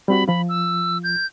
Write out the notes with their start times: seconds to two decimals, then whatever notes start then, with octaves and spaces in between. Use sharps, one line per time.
0.08 G3 C4 F#4 B5
0.28 F3 F4 B5
0.49 E6
1.04 G6